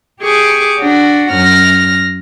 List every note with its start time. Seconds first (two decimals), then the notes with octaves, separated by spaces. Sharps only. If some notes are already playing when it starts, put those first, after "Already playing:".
0.22 G4 G#4 C#6 D6
0.79 D4 F#4
1.32 F#2 F6 A#6